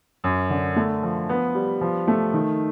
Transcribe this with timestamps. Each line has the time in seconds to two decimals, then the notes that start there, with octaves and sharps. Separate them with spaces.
0.24 F#2
0.50 D3
0.76 A3
1.03 F3
1.29 B3
1.55 G3
1.81 F3
2.08 A3
2.33 D#3